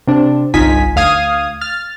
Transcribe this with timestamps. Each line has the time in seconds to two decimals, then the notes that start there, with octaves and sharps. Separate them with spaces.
0.07 C3 D4
0.54 G1 C2 D#4 F4 G#5 B6
0.96 D2 F5 D#6 G#6
1.61 F6 A6